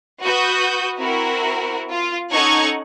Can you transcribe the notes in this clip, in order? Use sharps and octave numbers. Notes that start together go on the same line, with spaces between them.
F#4 B4 D#6 G6
C4 E4 F#4 A#4
F4
C#4 D#4 A4 F#5 C#6 G#6